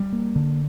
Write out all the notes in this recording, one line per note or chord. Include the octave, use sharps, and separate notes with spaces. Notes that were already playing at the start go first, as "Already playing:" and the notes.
Already playing: G3
A#3
D3